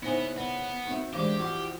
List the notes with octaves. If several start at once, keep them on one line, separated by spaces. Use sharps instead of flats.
C#3 B3 D#4 E4 C5 G#5
B3 B4
C4 D#4 F#4 E5
E3 G#3 D4 E4 G4 C5 F5
E3 F3 F#4 C#6